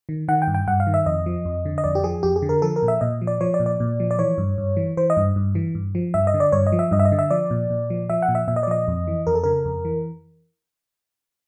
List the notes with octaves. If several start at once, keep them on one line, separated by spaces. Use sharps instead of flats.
D#3
D#3 F#5
G5
G2
G5
G2 F#5
F5
D#3
E5
F2 D#5
F3
F2
D3
D#5
F2 D5
G4
F3 G#4
F2 G4
G#4
D3
A#4
F3 A4
A#4
A#2
E5
A#2 D#5
F3
D5
F3 C#5
D5
A#2
D5
A#2
F3
D5
E3 C#5
G2
G2
E3
E3 C5
D#5
G2
G2
E3
G2
F3
G2 E5
D#5
D3
D5
G2 C#5
D#5
F3
E5
G2 D#5
E5
D#5
D3
E5
F3 D5
A#2
A#2
F3
F3 E5
F#5
A#2
E5
A#2 E5
D#5
D5
F3 D#5
F2
E3
F2 A#4
A4
C#3 A#4
F2
E3